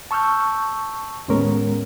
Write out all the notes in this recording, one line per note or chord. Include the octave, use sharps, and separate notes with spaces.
A5 C#6 E6 F6 G6
D#2 A2 G#3 B3 C#4 A#4